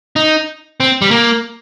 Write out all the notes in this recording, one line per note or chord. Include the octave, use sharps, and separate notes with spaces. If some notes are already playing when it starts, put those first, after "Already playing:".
D#4
C4
G3
A#3